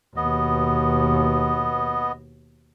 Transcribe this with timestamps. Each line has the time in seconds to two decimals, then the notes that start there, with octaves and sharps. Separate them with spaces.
0.17 D#2 B2 B3 D#5